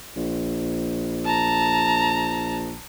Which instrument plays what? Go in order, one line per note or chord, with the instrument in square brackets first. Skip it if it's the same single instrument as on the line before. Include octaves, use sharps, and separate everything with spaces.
[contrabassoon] A#1
[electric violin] A5 A#5